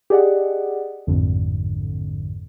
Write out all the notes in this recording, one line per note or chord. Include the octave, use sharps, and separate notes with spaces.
G4 G#4 D5 D#5 F#5
A1 F2 G#2 D3